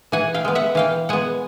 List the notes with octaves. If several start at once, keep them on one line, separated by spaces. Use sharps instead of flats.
E3 F#5 G#5
F5 G5
G#3 B3
E5 F#5
E3 F5 G5
G#3 B3 F#5 G#5